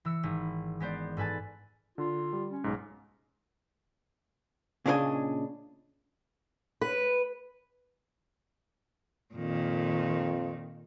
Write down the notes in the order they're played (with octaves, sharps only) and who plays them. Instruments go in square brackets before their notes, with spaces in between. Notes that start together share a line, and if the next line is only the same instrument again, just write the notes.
[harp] E3 E6 C#7
G#1
G#3 B3 C5 D5
G#2 A4 B4 G#5 A5
[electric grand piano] D3 [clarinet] F4
[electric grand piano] G3
[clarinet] C#4
[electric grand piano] B1 G#2
[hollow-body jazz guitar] A#2 C#3 D4 A#4 D#5 G#5
[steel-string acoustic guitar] B4
[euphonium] F2 [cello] A#2 D#3